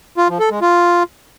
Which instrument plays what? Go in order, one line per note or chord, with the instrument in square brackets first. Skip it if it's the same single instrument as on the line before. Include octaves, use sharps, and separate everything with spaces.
[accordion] F4
F3
A4
G#3
F4